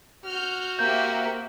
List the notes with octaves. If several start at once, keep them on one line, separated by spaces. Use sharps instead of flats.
F#4 F6 G6
A#3 C4 G4 E5 G6